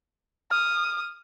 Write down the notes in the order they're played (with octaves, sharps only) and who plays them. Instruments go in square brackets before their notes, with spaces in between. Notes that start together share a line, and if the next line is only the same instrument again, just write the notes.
[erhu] D#6 [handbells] F6